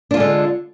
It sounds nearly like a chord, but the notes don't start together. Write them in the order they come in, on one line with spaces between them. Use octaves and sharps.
D4 F4 G#3 D3